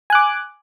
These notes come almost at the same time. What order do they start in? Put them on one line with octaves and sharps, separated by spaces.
G#5 F#6 D6